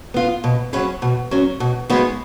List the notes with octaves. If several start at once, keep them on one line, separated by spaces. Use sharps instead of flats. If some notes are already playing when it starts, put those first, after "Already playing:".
B3 F4
B2
F#3 C#4 G#4 B4
B2
F#3 C#4
B2
G#3 B3 D#4 F#4